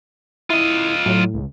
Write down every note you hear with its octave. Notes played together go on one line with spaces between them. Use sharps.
E4 F4 D#5
A2 F#3
C#2